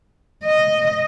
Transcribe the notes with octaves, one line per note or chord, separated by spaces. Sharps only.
D#5